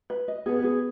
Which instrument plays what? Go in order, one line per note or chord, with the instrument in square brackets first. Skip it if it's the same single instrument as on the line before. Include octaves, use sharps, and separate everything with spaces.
[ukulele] B4
D#5
[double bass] B3 [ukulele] G#4
[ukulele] G#4